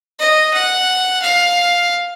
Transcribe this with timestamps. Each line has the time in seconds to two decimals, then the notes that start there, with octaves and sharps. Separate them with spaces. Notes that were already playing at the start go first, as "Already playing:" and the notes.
0.19 D#5
0.53 F#5
1.22 F5